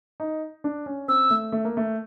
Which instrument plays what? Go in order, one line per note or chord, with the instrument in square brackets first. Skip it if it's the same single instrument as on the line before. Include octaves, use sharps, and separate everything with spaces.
[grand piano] D#4
D4
C#4
[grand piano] C4 [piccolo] E6
[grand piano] A3
A3
A#3
A3